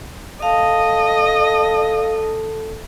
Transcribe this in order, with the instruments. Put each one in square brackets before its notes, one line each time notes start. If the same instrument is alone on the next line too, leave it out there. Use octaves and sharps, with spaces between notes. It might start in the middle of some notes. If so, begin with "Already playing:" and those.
[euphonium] A4 [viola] D#5 [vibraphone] F5 A5